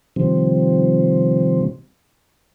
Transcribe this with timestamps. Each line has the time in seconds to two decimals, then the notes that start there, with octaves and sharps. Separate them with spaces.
0.16 C3 D#3 F3 G3 C4